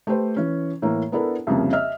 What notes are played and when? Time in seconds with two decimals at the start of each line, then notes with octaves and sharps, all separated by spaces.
0.07 A3 G4 B4 C5
0.36 E3 C#4
0.82 A2 E3 A#3
1.12 B3 D4 E4 A4 A#4
1.47 C2 F2 C#3 F3 A#3
1.73 D#5 E5 F6